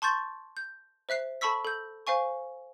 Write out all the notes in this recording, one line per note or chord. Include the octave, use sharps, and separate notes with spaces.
A5 C6 C#6 G6 A6
G6
C5 E5 F#6 C7
A4 A5 B5 C#6 E6 B6
A4 G6
C5 F5 G#5 C#6